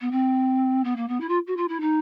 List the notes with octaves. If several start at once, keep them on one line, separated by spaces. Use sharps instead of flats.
B3
C4
B3
A#3
B3
E4
F4
F#4
F4
E4
D#4